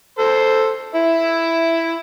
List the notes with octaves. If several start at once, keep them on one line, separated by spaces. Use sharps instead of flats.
A4 C5
E4 E5